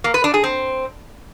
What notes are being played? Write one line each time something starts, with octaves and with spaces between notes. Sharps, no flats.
A#3
B4
D4
G#4
C4